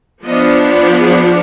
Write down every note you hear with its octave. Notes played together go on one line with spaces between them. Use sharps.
F3 B3 D4 D#5
G#4